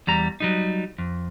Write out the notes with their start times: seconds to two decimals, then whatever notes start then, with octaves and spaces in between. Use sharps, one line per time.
0.07 E2 G3 A#5
0.40 F#3 G3 D#4
0.98 F2